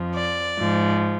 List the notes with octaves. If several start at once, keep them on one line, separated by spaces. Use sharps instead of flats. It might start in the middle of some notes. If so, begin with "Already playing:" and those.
Already playing: F2 F3
D5
G#2 F3